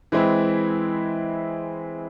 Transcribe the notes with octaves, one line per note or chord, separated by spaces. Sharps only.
E3 G#3 C4 E4